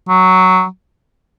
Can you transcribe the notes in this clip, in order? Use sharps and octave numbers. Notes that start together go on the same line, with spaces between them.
F#3